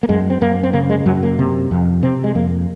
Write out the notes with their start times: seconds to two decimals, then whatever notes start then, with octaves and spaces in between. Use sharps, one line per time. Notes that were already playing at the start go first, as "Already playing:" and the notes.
0.03 A#3
0.09 F#2 G#3
0.30 C4
0.41 F#2 A#3
0.63 C4
0.73 C#3 A#3
0.90 G#3
1.06 F#2 F#3
1.23 A#3
1.39 C3
1.71 F2
2.03 C3 C4
2.24 G#3
2.35 F2 A#3